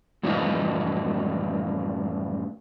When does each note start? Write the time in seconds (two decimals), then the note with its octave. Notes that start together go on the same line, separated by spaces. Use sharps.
0.23 F#2 A2 E3 F3 G3 D#4